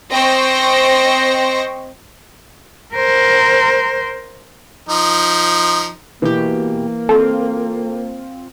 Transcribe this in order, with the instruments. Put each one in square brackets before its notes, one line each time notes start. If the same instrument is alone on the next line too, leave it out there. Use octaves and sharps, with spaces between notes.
[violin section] C4 C5 D#5 G5 C#6 A#6
[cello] A#4 C5
[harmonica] F3 D#4
[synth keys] B2 G4 [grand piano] E3 [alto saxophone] A#3
[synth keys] C4 F4 [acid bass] A4